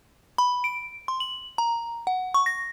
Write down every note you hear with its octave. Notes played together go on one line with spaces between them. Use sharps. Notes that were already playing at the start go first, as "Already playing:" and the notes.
B5
D7
C6
F#7
A#5
F#5
C#6
A#6